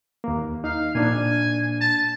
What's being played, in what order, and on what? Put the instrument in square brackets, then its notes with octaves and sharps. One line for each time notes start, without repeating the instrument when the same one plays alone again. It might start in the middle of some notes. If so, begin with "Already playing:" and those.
[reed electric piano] D#2 A#3
[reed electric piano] D#4 [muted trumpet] F5
[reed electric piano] A#2 A#3 D4 [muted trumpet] G#5
[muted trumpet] A5